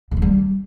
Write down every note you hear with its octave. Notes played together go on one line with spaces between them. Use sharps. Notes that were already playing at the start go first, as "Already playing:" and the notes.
D3
D#3
G3